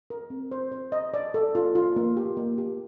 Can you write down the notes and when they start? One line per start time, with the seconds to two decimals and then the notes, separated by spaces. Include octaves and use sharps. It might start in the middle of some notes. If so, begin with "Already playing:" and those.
0.10 A#4
0.30 C4
0.52 C5
0.72 C5
0.92 D#5
1.14 D5
1.34 A4
1.55 F4
1.75 F4
1.96 A#3
2.17 G4
2.37 A#3
2.58 G4